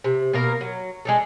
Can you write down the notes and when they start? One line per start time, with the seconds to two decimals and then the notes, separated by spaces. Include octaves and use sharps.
0.04 C3
0.33 B2 A#3 A#4
0.61 F#3
1.05 G#3 D4 A4